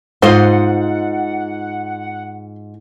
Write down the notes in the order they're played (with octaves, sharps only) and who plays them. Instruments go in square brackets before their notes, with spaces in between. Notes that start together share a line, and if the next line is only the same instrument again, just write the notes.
[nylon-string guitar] G#2 F4 D#5 [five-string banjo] C5 [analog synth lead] F#5